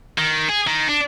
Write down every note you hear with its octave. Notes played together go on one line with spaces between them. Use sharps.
D#3
G#4
D#3
D4